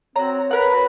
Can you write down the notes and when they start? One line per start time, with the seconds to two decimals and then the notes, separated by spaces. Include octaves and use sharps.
0.16 C4 F#4 C#5 A#5
0.51 A#4 B4 F#5
0.73 F#4